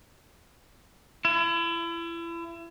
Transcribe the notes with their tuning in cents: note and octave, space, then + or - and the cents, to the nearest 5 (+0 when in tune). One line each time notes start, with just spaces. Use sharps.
E4 +35